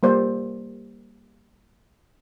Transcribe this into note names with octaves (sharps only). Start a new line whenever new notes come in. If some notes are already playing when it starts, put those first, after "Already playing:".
G3 A#3 C5 D5